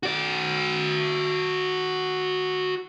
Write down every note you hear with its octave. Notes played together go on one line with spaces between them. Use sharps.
F#4 D5